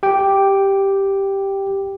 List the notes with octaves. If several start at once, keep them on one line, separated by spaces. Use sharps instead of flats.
G4 G5